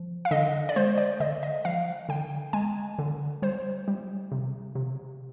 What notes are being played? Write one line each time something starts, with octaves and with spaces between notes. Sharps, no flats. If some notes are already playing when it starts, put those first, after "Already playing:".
Already playing: F3
F5
D3 D#5
D5
G#3 C5
D5
D3 D#5
D#5
F3 F5
D3 G5
G#3 G#5
D3
G3 C5
G3
C3
C3